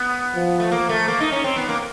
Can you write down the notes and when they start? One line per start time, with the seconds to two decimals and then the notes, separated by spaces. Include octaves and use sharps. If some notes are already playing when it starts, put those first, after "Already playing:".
Already playing: B3
0.35 F3
0.60 A3
0.72 A#3
0.89 A3
1.08 A#3
1.20 D#4
1.32 C#4
1.44 C4
1.56 B3
1.69 A#3